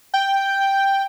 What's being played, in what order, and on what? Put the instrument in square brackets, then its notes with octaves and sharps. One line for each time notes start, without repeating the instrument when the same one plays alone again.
[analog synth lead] G5